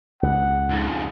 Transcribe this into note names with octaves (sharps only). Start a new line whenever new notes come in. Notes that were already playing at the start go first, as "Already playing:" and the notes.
C#2 F#5
F2 G#2